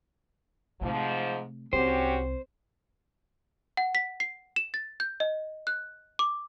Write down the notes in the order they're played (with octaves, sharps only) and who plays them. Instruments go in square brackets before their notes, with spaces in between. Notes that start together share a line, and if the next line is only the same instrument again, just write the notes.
[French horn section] G#2 F3 [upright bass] C3 A3
[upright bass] C2 [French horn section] C#4 F#4 G4 [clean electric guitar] C5
[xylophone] F#5
B6
C7
E7
A6
G6
D#5
F#6
D6